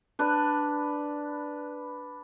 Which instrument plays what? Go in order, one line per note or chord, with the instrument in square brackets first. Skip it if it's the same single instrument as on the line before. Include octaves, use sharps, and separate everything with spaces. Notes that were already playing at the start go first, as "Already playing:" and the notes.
[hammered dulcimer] D4 B4